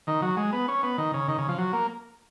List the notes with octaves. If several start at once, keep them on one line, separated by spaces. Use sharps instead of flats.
D#3
F#3
G#3
B3
C#4
B3
D#3
C#3
D#3
C#3
F3
F#3
A#3